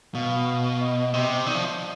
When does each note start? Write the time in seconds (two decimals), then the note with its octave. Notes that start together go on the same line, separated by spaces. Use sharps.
0.15 B2 F5
0.80 D#5
1.13 C3 D#5
1.46 D#3 D5
1.55 F3